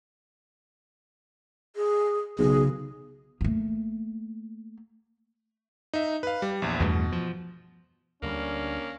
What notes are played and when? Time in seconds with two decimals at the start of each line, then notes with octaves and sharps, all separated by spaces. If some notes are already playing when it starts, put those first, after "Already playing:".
1.76 G#4
2.39 B1 C#3 G#4
3.41 A3 A#3
5.93 D#4 E5
6.23 B4 F5
6.42 G3
6.62 A#1 E2
6.80 E2 G2 B2 A3
7.12 F3
8.23 D2 D3 G3 A#3 C#4 D4